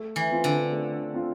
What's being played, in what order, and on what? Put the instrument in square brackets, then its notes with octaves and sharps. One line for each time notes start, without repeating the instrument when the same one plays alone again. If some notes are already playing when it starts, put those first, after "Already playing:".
Already playing: [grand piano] A3
[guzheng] E3
[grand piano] C4 F4
[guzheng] D3
[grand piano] A3
C4 F4